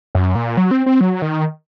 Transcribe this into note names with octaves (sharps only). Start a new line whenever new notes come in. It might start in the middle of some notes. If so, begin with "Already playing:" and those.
F#2
A#2
F#3
C4
C4
F#3
D#3